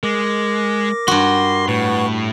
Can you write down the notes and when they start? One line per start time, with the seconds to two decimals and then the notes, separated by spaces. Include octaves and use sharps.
0.03 G#3 A#4 D6 A#6
1.08 G2 F#4 C6
1.68 A2 B4 F#5 C#6